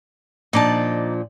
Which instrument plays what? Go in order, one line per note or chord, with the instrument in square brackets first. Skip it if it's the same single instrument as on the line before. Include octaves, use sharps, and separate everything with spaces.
[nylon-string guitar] A#2 F3 D4 [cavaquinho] D#4 D5 A5